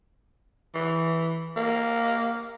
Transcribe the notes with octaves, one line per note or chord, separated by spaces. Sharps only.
E3
A#3